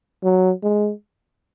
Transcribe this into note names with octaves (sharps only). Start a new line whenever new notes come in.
F#3
G#3